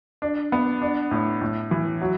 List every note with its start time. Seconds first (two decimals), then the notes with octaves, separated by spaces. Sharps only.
0.22 D4
0.52 B3
0.82 D4
1.11 A2
1.42 A2
1.71 E3
2.01 F#3